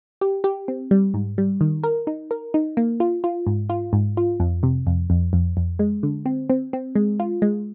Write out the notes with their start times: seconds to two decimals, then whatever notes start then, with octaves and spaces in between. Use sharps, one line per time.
0.21 G4
0.44 G4
0.68 C4
0.91 G3
1.14 G#2
1.38 G3
1.61 D#3
1.83 A#4
2.07 D#4
2.31 A#4
2.54 D#4
2.77 A#3
3.00 F4
3.24 F4
3.47 G#2
3.70 F4
3.93 G#2
4.17 F4
4.40 F2
4.63 C3
4.87 F2
5.10 F2
5.33 F2
5.57 F2
5.79 G#3
6.03 D3
6.26 C4
6.50 C4
6.73 C4
6.95 G#3
7.20 F4
7.42 G#3